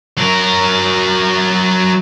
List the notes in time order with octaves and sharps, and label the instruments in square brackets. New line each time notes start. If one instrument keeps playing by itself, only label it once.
[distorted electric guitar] F#3 A#4